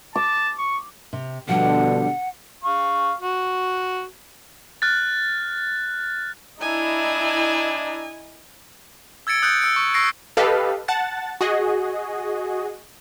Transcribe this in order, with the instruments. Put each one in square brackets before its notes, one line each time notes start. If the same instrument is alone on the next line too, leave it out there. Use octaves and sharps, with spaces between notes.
[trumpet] A5 [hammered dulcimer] D6
[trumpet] C#6
[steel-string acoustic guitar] C3
[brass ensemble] B2 D3 [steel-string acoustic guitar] F3 G3 D4 [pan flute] F#5
[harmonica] F5 C#6
F#4
[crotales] F6 F#6 A6
[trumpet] D4 [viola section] E4 D#5 A#5 [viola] G#5
[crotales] E6 G#6 A6 C#7 D7
D#6 F#6 G6 A6 C#7 D7
E6 C#7 D7
C#6
C#6 E6 A#6 C7 D7
[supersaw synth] G4 A4 B4 D#5 F5
F#5 A5 A6
F#4 G#4 D#5